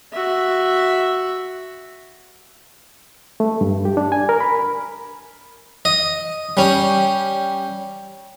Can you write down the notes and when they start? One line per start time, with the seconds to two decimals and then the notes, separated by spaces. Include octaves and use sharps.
0.13 F#4 E5
3.40 A3
3.61 G2
3.85 G4
3.97 D4
4.12 G#5
4.29 A#4
4.40 B5
5.85 D#5
6.57 G3 C#4